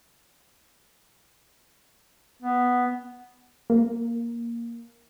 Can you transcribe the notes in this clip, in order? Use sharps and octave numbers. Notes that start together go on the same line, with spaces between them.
B3
A#3